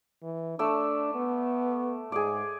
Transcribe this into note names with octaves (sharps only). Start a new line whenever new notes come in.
E3
A3 D4 D5 E6
B3
G#2 G#4 D5